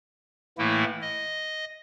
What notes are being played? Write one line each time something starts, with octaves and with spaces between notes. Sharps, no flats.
A2 E3 A3 A#3 E4
D#5